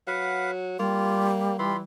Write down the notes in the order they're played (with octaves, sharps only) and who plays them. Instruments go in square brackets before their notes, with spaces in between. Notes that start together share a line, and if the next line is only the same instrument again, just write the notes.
[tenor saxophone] F#3 [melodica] B4 F5 F#5
[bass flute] G3 [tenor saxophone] A#3 [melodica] F4
[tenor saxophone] E3 [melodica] F4 B5 C6